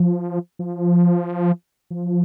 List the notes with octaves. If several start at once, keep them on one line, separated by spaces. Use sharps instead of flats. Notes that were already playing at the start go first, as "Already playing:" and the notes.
Already playing: F3
F3
F3